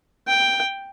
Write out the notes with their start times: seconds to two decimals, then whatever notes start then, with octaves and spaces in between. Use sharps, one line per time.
0.27 G5